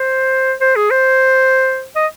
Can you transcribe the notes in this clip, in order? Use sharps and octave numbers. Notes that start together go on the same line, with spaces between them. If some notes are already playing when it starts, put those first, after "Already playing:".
Already playing: C5
C5
G#4
C5
D#5